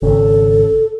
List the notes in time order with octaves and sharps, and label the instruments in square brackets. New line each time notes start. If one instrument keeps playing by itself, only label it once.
[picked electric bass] G#1 C#3 [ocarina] A4